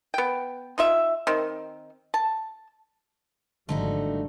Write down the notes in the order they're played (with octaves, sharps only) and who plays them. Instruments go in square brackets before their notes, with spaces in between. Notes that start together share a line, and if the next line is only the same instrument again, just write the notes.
[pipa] B3 G5
D#4 F4 E5
D#3 C4
A5
[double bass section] G#1 F3 G3 [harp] D3 [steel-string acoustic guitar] A3 D#4 F#4